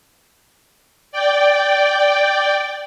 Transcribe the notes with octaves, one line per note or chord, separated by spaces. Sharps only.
D5 G5